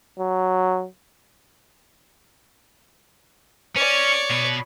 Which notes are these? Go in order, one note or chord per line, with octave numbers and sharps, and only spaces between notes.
F#3
C#4 C#5 D5
B2 B4